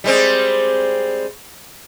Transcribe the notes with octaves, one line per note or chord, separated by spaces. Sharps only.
G3 G#3 C4